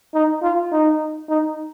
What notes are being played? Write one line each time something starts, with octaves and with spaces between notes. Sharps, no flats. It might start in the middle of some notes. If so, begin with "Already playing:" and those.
D#4
F4
D#4
D#4